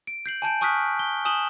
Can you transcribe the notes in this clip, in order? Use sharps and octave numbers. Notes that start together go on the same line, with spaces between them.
D7
G6 C7 F#7
G#5 A5 G6 D7
G#5 C#6 D#6 F6 F#6 B6
G7
G#5 D#6 E7 F#7 G7